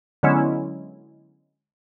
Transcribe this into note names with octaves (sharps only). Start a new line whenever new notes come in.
D3 F#3 G#3 B3 C#4 E4